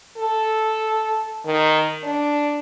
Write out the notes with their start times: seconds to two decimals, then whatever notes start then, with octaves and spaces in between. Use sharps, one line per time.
0.18 A4
1.45 D#3
2.03 D4